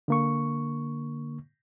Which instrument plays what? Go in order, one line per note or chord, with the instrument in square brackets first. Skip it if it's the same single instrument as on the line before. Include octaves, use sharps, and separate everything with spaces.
[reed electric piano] D3 A#3 C#6